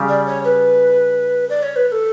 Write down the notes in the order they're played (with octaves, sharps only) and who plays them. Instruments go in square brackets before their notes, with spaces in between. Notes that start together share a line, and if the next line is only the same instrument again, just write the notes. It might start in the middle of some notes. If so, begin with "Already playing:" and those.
Already playing: [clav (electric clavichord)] C#3 G3
[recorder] D5
C#5
B4
D5
C#5
B4
B4
A4